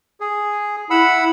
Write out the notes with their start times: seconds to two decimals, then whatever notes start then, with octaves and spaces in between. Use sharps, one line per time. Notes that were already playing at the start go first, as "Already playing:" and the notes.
0.20 G#4
0.90 E4 F#5 B5 E6